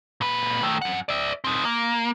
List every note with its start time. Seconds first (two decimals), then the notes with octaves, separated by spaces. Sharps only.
0.21 A#2 B4
0.63 D#3 A3
0.82 F#2 F#5
1.09 D5 E5
1.44 C4 D#4
1.65 A#3